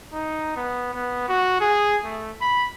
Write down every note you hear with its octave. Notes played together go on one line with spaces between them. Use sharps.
D#4
B3
B3
F#4
G#4
A3
B5